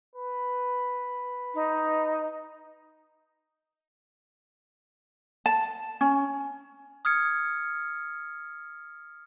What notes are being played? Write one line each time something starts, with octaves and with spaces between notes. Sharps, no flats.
B4
D#4
A5
C#4
D#6 F6 G#6 C#7